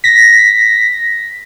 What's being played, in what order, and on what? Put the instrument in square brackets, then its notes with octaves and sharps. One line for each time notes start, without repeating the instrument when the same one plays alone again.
[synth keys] A#6 B6